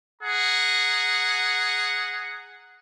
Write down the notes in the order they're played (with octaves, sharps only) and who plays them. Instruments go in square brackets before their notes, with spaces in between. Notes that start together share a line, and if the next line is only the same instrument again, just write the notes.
[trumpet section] G#4 F#5 A#5